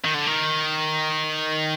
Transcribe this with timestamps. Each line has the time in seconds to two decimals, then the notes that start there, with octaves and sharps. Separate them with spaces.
0.04 D#3
0.14 D3
0.27 D#3